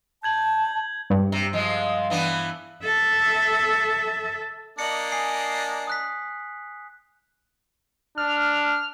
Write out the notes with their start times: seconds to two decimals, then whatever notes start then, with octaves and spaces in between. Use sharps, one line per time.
0.23 A5 G6 G#6 F#7
1.10 G2
1.32 C3
1.53 F3 G#3
2.10 E3 B3 D4
2.84 A4 E5
4.79 A#3 D4 D#5 C#7 F#7
5.12 G#5 D#6 C7
5.87 D#6 F#6 B6
8.18 D4 F6